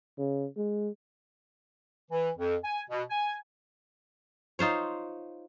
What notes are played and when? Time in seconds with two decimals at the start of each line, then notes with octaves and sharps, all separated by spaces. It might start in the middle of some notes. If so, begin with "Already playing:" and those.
0.18 C#3
0.57 G#3
2.11 E3
2.37 F2
2.64 G#5
2.90 B2
3.10 G#5
4.59 D#4 F4 C5 C#5